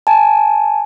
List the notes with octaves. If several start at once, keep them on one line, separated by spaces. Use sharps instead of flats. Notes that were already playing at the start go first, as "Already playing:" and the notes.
G#5 A5